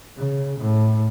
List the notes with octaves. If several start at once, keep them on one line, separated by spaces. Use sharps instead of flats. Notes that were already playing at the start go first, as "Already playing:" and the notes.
C#3
A2